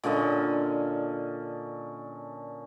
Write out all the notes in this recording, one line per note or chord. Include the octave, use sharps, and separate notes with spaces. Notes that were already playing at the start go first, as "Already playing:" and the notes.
A#2 D3 C#4 D#5